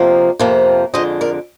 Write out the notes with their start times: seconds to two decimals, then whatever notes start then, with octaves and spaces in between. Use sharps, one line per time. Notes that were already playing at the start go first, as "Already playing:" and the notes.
Already playing: F2 C3 F3 A#3
0.39 F2 C3 F3 A#3
0.94 F2 D3 G#3 C5 D#5
1.21 A#4 D5